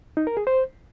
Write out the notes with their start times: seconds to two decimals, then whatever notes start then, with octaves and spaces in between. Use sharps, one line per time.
0.17 D#4
0.27 A#4
0.37 G#4
0.47 C5